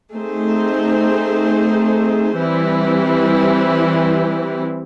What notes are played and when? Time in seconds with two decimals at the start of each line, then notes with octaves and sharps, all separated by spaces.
0.14 A3 C4 D#4 G#4 C5
2.39 E3 G3 C4 E4